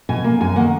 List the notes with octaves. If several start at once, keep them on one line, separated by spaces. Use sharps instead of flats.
B2 G#5
A#3
F#2 G#5
D#3 A#3 F#5